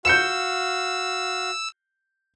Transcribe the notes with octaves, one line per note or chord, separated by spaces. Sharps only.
F#4 F5 E6 G6 C#7 E7